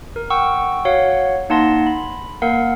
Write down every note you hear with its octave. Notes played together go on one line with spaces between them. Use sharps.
A#4
F#5 G5 C#6 E6
F#4 C#5 F5 F#5
A#3 D#4 F#5 A5 C6 A#6
B5
A#3 A#4 F5 F#5